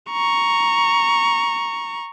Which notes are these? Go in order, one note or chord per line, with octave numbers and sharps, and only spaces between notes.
A#5 C#6